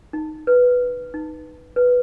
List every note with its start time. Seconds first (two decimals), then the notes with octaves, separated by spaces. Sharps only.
0.13 D#4
0.47 B4
1.14 D#4
1.76 B4